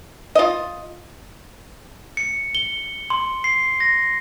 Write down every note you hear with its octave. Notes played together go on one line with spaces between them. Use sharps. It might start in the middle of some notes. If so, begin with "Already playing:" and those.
F4 D#5
C#7
G7
C6
C7
A#6